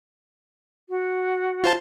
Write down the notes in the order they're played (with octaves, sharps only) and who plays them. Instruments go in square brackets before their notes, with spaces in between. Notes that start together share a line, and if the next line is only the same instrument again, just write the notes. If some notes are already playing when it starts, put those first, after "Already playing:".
[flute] F#4
[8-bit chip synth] F4 C5 A5